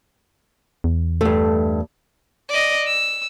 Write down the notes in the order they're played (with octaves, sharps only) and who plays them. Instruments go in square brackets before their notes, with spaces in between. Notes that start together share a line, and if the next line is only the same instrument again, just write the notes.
[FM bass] E2
[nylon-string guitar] G2 A3
[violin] D5 D#5
E6